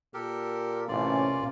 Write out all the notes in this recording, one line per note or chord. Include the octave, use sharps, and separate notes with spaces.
A#2 G4 A4 A#4
A1 C3 A#3 C#4 F4 D5